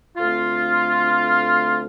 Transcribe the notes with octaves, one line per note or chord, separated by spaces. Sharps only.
D2 D3 A3 C4 F4